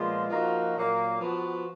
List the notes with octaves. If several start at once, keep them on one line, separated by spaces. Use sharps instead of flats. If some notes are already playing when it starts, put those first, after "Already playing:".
Already playing: A#2 F3 G#3 B3 F4
F3 A#3 D#4 F#4
A#2 F#3 A#3
F3 B3 F#4